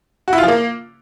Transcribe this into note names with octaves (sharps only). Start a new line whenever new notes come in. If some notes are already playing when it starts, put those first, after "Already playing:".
F#4
E4
F4
F3
A#3